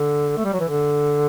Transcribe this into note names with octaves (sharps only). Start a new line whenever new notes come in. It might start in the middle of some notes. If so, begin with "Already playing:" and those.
Already playing: D3
A3
G3
F#3
E3
D3